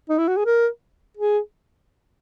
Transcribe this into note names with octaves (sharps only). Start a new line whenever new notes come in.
D#4
E4
F#4
G#4
A#4
G#4